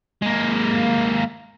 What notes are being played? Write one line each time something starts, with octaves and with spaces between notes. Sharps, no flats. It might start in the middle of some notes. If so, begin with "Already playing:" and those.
G#3 A#3